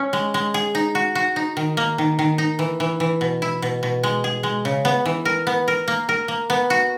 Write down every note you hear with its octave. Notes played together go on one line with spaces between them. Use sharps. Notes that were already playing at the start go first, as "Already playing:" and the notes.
Already playing: C#4
G#3
G#3
G#4
D#4
F#4
F#4
D#4
D#3
A#3
D#3
D#3
D#4
E3
E3
E3
B2
E4
B2
B2
G#3
G#4
G#3
C#3
B3
E3
A#4
B3
A#4
A#3
A#4
A#3
B3
F#4